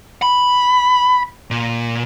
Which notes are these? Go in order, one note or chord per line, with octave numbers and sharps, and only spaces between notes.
B5
A#2